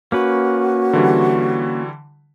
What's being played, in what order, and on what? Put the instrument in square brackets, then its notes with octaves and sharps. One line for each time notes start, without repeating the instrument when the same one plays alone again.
[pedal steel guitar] A#3 C#4 B4 [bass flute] F#4
[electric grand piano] D3 E3 G3